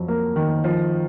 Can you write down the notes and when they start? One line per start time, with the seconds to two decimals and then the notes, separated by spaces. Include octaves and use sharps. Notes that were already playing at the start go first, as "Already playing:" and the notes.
Already playing: F2 F#3
0.08 A#3
0.36 D#3
0.64 F3